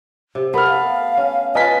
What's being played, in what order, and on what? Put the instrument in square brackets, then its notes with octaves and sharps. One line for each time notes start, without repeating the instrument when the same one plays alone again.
[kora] C3
[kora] A3 B3 [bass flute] A#4 [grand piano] B5 F6
[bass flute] F5
[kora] C#4
[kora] C#4 F4 [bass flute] B4 [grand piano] D#5 G#5 B6